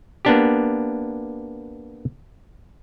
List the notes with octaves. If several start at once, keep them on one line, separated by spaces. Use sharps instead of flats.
A#3 B3 D4 G4